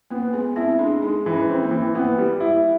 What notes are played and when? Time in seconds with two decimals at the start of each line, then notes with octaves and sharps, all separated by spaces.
0.10 A#3 B3
0.33 G#3 B3
0.56 C4 E4
0.79 G#3 D4
1.02 G#3 D#4
1.26 E3
1.33 C#4
1.49 C4
1.63 A#3
1.71 E3
1.95 A#3 B3
2.18 G3
2.40 E4